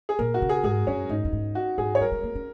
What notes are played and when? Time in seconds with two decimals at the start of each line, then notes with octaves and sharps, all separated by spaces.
0.09 G#4
0.19 A#2 A#4
0.34 F#4
0.42 C#3
0.49 G#4
0.64 G#2 G#4
0.87 F#2 C#4
1.09 G#2 D#4
1.25 F#2
1.32 G#2
1.55 F#4
1.78 G#2 G#4
1.95 C#5
2.01 F#3 A#4
2.12 G#3
2.24 A#3
2.35 C#4